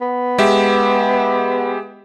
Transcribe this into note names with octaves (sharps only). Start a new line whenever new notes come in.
B3
G#3 G4 E5